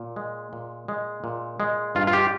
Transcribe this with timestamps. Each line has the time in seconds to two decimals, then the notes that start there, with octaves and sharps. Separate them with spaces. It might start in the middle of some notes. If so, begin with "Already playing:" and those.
Already playing: A#2
0.16 G#3
0.53 A#2
0.88 G#3
1.24 A#2
1.60 G#3
1.95 G2 F4
2.07 F4
2.13 G4